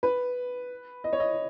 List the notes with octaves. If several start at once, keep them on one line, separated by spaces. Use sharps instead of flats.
B4
D#5
C#5
D#5